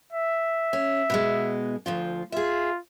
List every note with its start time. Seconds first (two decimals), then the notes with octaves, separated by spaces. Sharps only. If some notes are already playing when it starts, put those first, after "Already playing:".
0.13 E5
0.73 C#4
1.10 B2 E3 G#3
1.86 D2 F3 F4
2.32 F4 G#4 E5